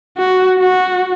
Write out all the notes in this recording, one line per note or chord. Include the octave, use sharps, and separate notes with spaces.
F#4
F#4